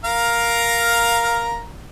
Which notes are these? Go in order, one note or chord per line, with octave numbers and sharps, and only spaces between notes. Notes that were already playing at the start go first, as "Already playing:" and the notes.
A#4 F5 A#5